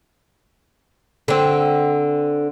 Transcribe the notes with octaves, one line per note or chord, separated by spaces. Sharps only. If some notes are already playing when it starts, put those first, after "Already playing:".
D3 C4